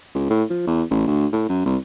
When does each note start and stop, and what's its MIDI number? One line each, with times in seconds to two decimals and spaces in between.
0.15 0.28 37
0.30 0.44 45
0.50 0.64 53
0.67 0.83 40
0.91 1.03 33
1.08 1.27 38
1.33 1.45 45
1.49 1.62 42
1.66 1.77 36